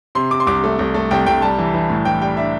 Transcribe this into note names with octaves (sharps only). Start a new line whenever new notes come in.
C3 C6
C3 D6
C6
C2 D6
A3
C2
A3
C2 G5
C2 G5
G3 A5
E3
E3
A2
E3 G5
G3 G5
D4 E5